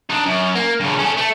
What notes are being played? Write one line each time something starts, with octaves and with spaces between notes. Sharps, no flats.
D4 D#4
F#2
A#3
G2 C#3
C#4 A4
A3